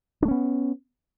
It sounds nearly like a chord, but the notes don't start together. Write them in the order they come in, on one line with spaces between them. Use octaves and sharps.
D4 A3 C#4 B3